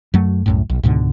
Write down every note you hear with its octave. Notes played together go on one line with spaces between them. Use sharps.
F#2 F#3 A3
C2 F#2 A2
B1
C#2 G#2 B2 D3